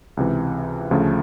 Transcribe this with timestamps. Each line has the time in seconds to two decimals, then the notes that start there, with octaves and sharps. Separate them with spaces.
0.17 C#2 C3 E3
0.91 D2 C#3 F3 A3